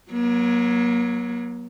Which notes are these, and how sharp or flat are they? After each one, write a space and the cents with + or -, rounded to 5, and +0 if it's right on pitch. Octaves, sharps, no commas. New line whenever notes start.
F#3 +0 A#3 +40